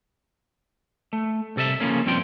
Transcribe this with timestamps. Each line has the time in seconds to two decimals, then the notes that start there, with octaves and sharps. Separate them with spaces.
1.13 A3
1.56 C2 C3 A4 D#5 E5
1.80 C#3 E3 F3 A#3 C#4
2.06 G2 F3 C4 F4 G5